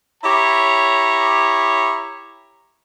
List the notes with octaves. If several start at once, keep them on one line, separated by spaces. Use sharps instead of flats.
E4 G4 C#5 A#5